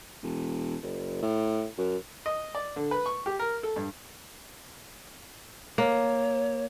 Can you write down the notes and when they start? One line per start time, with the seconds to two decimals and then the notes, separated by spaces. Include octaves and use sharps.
0.23 E1
0.83 F#1
1.23 A2
1.78 F#2
2.26 D#5
2.55 D5
2.76 D3
2.91 B4
3.06 C#6
3.26 G4
3.39 A#4
3.63 A4
3.76 G2
5.78 A#3 C#5